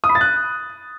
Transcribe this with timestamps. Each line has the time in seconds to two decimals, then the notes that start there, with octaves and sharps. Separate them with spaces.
0.04 D#6
0.09 B5
0.15 A6
0.21 F#6